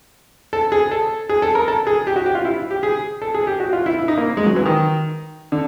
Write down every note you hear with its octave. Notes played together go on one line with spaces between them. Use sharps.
A4
G#4
A4
G#4
A4
A#4
A4
G#4
G4
F#4
G4
F4
E4
G4
G#4
A4
G#4
G4
F#4
F4
E4
E4
D#4
A#3
G#3
F#3
E3
D#3
D3